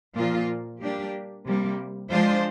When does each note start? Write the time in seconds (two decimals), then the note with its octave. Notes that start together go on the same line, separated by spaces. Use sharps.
0.16 A#2 F3 A#3 F4
0.81 G3 A#3 D4 G4
1.46 C3 G3 A#3
2.10 F3 G#3 D4 F4 C5